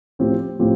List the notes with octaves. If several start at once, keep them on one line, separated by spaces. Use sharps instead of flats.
A2 F3 C4 G4
A2 F3 C4 G4